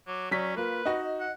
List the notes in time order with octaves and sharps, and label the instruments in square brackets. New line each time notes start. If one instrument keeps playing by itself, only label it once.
[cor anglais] F#3 [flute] D6
[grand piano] F#3 B6 [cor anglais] C#4 [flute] D5
[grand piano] A#3 [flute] F4 [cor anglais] B4
[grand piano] D#4 F#4 [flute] D#5
[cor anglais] F#5